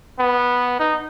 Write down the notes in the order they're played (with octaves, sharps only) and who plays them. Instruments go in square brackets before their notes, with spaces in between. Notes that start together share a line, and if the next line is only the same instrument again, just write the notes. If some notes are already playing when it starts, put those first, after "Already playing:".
[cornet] B3
D#4